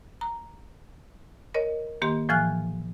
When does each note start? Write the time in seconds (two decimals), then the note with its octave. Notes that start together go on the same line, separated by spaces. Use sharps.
0.21 A#5
1.54 A#4 C#5 D#5
2.02 D#3 A#3 G4 C6
2.29 A2 E3 F3 G#5 F6 F#6